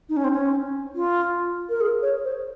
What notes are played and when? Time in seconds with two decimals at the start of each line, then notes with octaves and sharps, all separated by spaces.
0.09 D#4
0.17 C#4
0.24 C4
0.32 C#4
0.95 F4
1.69 A#4
1.81 G#4
2.02 C#5
2.24 C5